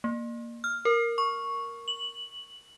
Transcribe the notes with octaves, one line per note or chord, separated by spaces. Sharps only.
A#3
F6
A#4
C#6
F#7